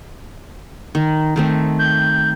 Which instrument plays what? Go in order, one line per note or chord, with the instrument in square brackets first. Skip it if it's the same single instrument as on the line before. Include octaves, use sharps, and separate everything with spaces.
[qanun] D#3
D#3 A3 C4
[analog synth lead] G6